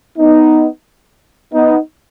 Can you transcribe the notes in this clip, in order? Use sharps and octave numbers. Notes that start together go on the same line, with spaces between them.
B3 D#4
B3 D#4